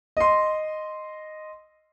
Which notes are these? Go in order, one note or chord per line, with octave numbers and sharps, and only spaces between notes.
D#5 C6